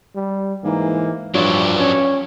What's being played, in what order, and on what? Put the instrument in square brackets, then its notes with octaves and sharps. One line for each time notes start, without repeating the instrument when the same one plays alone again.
[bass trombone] G3
[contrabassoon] G#2 [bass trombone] E3 [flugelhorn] A#3
[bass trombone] G2 [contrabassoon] F3 [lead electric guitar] F#3 D4 [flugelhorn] C#5
[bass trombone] C#4 [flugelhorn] C#5